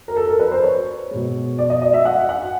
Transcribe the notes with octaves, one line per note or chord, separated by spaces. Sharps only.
A#4
A4
A#4
B4
C5
C#5
B2 G#3
D5
D#5
D#5
E5
F#5
F#5